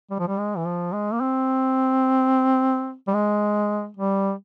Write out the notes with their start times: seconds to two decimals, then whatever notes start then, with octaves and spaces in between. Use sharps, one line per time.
0.10 G3
0.19 F3
0.28 G3
0.38 G#3
0.57 E3
0.66 F3
0.93 G#3
1.12 A#3
1.21 C4
3.08 G3
3.14 G#3
3.97 G3